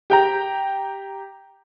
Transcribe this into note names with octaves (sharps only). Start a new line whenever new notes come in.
G4 G5 A#5